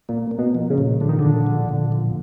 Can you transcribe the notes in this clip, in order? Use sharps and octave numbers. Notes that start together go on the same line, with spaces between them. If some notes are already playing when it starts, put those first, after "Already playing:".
A#2 A#3
A#3
B2
F3
C#3
A#2
D3 F3
D#3
A#2 D3
F3
A#2
F3